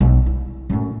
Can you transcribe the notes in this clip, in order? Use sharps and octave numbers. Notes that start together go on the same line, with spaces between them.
B1
E4
F#2 A2